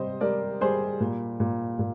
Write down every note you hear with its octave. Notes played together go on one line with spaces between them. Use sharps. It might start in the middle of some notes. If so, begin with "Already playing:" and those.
Already playing: C3 G3 C5 D#5
G3 A#4 D5
G3 G#4 C5
A#2
A#2
A#2